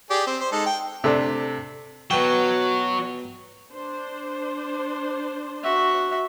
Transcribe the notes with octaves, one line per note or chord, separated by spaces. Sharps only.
G4 G#4 D5
C4
C5
G#3 D#4 A4
G5
C3 A3 D4
B2 F#3 G5
D4 C5
F#4 E5